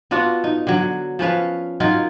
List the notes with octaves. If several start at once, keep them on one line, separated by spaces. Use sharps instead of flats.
B3 D4 F4 F#4
D#4
D3 F#3
F3 C#4 B4 F5
F#3 D#4 F4 A#4